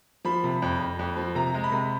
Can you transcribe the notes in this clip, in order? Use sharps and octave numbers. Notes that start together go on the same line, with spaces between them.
F3 B5
C3
F2
F2
F2
F3
C3 A#5
G#3
B5
C3